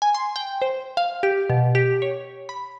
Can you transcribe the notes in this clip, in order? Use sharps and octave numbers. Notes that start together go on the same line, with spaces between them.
G#5
C6
G5
C5
F5
G4
B2
G4
C#5
B5